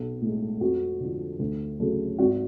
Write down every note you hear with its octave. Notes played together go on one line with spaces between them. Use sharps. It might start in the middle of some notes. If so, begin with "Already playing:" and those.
Already playing: B1
A2 G#3
F2 F#4
D3 F3
D2
C#3 F#3 A3
G#1 F#4